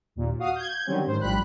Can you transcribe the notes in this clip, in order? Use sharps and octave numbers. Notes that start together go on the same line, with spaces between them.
D#2 A#2
F#4 F5 D#6
G6 G#6
D3 D#3 F#3 G3 C4 C#4
G#2 D#3 C5
A1 G2 F3 G3 B5 F#6